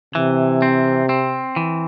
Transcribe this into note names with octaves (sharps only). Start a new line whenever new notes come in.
C3 E3
C4
C4
E3